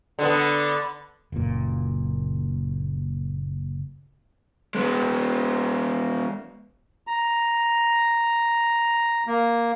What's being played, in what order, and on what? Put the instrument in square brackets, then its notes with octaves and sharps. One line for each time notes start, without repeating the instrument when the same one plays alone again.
[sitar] D3 B3
[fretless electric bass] F#1 A#2
[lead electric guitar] G#3 B3
[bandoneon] A#5
A#3